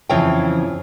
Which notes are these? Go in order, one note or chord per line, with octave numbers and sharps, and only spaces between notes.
F2 C#3 E3 F4 C#5 G5